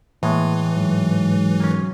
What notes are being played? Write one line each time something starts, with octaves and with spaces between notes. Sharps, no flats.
A2 E3 G#3 A#3
G#2 F#3
A#3 C#4